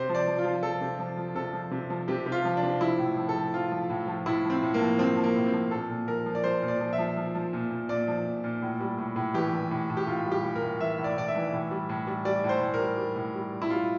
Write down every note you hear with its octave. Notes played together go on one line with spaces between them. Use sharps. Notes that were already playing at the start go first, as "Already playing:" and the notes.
Already playing: C3 C5
F3
D5
F3
F4
F3
F3 A4
C3
F3
F3
C3 A4
F3
C3
F3
C3 G4
C3
F4
F3
D4
C3
F3 E4
A2
F3
A4
F3
F3 F4
F3
A2
F3
A2 E4
F3
C4
A2
A#3
F3
F3 C4
F3
A#3
A2
C4
F3
A#2 A4
A#2
F3 A#4
F3
D5
F3 C5
A#2
D5
F3
E5
F3
F3
F3
A#2
A#2
A#2 D5
F3
A#2
A#2
A2
G3
A2
A2
E3 G4
E3
A2
A2
G4
A2 F4
G3
G4
A2
A#4
A2
E3 E5
A2
D5
A2 D5
E5
E3
A2
G3
A2
G3
G3 D5
A2
C5
A2
A#4
G3
G3
A2
G3
G3
E4
G3 F4